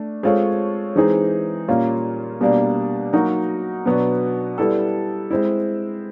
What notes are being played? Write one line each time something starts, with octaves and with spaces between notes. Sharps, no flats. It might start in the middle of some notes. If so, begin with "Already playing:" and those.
Already playing: A3 D4
G#3 C4 F4 A4 C#5
E3 G#3 C4 D#4 G#4
A#2 G3 A#3 C#4 F4
B2 G3 A#3 D4
F#3 A#3 D#4 F#4 A#4
B2 F#3 B3 D4 F#4
G3 B3 E4 A4
G#3 C4 E4